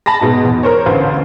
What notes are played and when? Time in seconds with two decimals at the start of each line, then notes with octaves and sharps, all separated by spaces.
0.06 A5 B5 A6 A#6
0.21 G#2 B2 G#3
0.45 E2
0.63 A#4 C5 C#5
0.86 A1 D2 B4 C5 F5